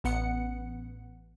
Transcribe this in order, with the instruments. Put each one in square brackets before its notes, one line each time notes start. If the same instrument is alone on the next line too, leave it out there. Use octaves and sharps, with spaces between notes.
[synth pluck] A1 B3 F#5 C#7